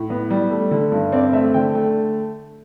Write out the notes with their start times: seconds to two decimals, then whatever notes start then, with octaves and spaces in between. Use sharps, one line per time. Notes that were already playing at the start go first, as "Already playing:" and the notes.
Already playing: A2
0.10 B3
0.30 G3
0.50 A3
0.71 D3
0.92 G2
1.12 C4 D5
1.33 A3 E5
1.54 D3 G5
1.75 A3